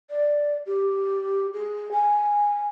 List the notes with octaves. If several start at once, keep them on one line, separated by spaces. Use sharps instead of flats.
D5
G4
G#4
G#5